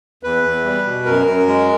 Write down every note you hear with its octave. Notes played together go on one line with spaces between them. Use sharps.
E2 B4
E2
G3
B2
F#2 A#4
F#2
G#3